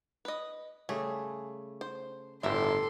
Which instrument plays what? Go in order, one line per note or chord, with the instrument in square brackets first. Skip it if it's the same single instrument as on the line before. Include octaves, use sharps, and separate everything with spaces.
[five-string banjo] B4 D#5
[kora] C#3 G3 A3 [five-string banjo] G#4
[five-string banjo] C5
[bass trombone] G1 [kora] A2 G4 A#4 [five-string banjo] E4 E5 [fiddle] A4 C6